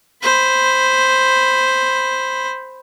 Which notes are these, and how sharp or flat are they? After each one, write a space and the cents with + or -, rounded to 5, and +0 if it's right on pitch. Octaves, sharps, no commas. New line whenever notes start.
C5 +0 B5 +5